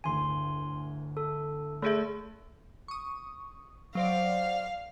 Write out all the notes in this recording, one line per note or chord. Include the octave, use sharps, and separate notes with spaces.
D1 G1 D2 G#5 C6
A4
A3 G#4 A4 E5 F#6 G6 D7
C#6 D#6
F#3 C5 D5 F5